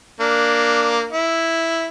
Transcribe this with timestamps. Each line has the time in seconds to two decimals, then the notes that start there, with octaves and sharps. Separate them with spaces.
0.21 A#3 D4
1.12 E4